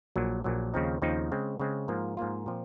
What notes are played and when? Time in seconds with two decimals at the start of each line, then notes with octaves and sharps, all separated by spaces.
0.16 A#1 A#2 F#3
0.44 A#1 A#2 F#3
0.74 D#2 C#3 F3 C4 D#4
1.02 D#2 C#3 F3 C4 D#4
1.32 C#3 G#3 C4
1.60 C#3 G#3 C4
1.88 G#2 F3 A#3 F4
2.17 G#2 F3 A#3 F4
2.46 A#2 F3 C4